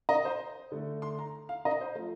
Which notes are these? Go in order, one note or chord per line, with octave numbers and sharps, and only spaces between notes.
D#5
C5
D3 A3
C6
A#5
F5
D#5
C5
F3 A3